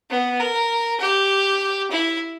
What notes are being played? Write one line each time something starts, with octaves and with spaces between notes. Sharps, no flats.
B3
A#4
G4
E4